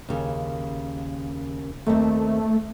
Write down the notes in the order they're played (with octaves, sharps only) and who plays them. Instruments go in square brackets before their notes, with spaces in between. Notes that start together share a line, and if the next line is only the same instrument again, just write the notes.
[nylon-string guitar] D#2 C#3
[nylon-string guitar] D#2 C4 [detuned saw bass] A3